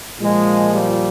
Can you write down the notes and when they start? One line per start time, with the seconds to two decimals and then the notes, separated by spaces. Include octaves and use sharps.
0.21 A#2 F3 G#3
0.74 G3